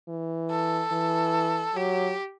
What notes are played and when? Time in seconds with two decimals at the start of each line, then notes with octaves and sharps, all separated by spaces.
0.08 E3
0.50 A4
0.92 E3
1.75 F#3 G4